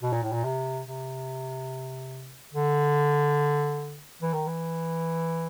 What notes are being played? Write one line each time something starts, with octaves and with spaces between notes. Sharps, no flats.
B2
A#2
A2
A#2
C3
C3
D3
E3
D#3
E3